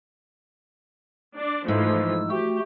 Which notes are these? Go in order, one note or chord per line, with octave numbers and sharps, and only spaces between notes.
D4 D5
G#2 E3 F3 A3 E6
A3 F#4 G4